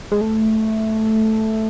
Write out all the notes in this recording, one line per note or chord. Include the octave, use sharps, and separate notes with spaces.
G#3
A3